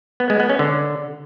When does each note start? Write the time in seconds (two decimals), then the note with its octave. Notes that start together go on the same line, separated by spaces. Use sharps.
0.20 B3
0.30 G#3
0.40 B3
0.49 C#4
0.59 D3